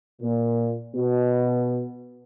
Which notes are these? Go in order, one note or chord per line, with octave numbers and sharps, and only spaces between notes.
A#2
B2